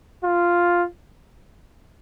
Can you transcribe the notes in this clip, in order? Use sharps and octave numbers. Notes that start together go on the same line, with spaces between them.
F4